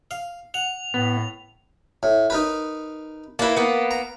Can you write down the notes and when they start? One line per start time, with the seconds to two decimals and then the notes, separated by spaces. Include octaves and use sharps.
0.11 F5
0.54 F#5 F7
0.94 A2 B3
2.03 A2
2.30 D#4 A#4 B4
3.39 A#3 E4 B4 A5
3.56 A#3 B3
3.91 A#5